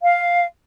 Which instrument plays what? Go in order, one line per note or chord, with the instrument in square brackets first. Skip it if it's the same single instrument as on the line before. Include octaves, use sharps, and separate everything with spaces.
[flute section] F5